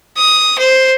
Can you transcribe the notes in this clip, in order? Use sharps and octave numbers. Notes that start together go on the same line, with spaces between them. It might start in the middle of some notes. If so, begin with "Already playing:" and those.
D#6
C5